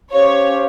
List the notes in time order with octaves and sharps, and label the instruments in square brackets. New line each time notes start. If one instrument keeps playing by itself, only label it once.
[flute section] C#4 G4 C5 F5 [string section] C#5